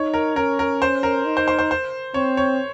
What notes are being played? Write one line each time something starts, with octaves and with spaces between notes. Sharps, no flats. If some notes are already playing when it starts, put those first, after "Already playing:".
Already playing: D#4 C#5
A#4
C#4 A#4
A#4
C5
A#4
D#4
C5
C5
C5
C5
C4 C#5
C#5